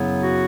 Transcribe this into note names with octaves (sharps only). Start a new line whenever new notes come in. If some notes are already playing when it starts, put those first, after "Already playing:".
Already playing: F#2 C#3 F#3 B3 E4
F#4